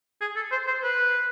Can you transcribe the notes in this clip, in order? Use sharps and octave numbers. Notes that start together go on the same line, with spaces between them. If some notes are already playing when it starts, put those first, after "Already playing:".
G#4
A4
C5
C5
B4